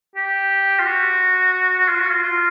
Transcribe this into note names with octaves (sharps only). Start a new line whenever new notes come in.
G4
F4
F#4
F#4
F4
F#4
F4
F4